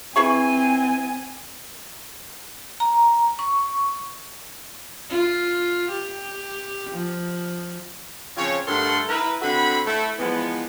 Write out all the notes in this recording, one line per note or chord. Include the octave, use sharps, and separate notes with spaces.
E3 C4 G#4 G#5 C#6
A#5
C#6
F4
G4
F3
C#3 F3 C4 F4 C#5
G2 A3 A4 A#4 F#5 C6
E4 A#4 B4
D3 C4 F#4 A4 B5
A3 E4
E3 F3 G#3 B3